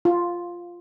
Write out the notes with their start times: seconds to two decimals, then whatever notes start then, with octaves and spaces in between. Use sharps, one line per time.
0.05 F4